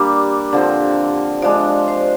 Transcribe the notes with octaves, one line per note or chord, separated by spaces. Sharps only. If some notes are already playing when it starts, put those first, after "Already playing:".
Already playing: G3 A#3 D4 G4
D3 F3 C4
F3 G#3 D4 D5
C5